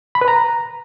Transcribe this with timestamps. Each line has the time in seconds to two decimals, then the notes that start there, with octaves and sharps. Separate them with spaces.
0.15 B5
0.21 B4
0.28 A#5